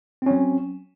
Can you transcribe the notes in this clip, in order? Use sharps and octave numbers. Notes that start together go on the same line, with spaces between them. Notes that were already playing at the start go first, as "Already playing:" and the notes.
F#3 C4 C#4